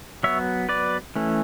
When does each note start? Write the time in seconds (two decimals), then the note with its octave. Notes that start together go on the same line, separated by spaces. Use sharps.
0.23 F#3 B3 C#5 E5
0.69 B4 D5
1.16 E3 A3 C#4